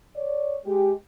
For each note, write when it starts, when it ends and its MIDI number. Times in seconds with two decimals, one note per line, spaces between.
0.15 0.56 73
0.15 0.56 74
0.66 0.91 56
0.66 0.91 67